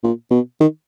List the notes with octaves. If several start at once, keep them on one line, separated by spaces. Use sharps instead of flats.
A#2
B2
D#3